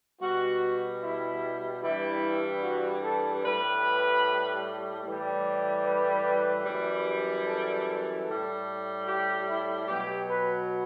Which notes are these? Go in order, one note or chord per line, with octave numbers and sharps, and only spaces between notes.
B2 G3 F#4
E4
G2 E3 G3 E4
F#4
A4
A2 G3 B4
A2 E3 G3
B4
F#2 E3 G3
A4
A2 G3
G4
E4
B2 F#3 G4
B4